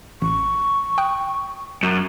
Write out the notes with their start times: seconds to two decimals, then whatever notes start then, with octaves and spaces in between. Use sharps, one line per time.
0.22 A1 C#6
0.98 G5 D#6 F#6
1.83 F#2